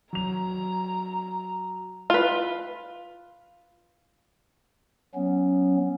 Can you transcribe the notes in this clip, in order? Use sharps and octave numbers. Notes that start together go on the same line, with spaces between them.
F#3 A#5 F7
F4 B4
F#3 B3 C#4